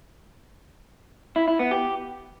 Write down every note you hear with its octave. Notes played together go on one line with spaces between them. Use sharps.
E4
E4
B3
G4